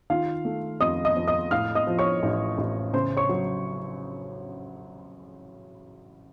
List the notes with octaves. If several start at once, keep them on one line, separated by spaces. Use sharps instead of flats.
D#3 F4 F5
A3
F2 D#5 D#6
D#5 D#6
F2
D#5 D#6
A2 F5 F6
D#5 D#6
F3
C#5 C#6
A1
A1
C#3 C5 C6
C#5 C#6
F#3